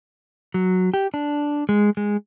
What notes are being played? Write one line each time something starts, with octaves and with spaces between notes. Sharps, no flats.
F#3
G4
D4
G#3
G#3